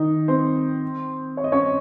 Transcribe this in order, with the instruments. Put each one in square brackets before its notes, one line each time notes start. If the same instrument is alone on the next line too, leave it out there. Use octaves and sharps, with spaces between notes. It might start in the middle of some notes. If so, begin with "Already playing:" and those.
Already playing: [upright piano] D#3 D#4
C4 C5
C#5
D#5
C#4 C#5